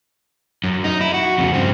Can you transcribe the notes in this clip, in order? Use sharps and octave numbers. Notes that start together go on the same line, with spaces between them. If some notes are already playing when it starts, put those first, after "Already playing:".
F#2
D#4
E4
F#4
F2 C#3
G2 C4